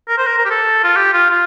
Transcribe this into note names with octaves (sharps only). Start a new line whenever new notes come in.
A#4
C5
A#4
A#4
G4
A4
F4
G4
F4
F4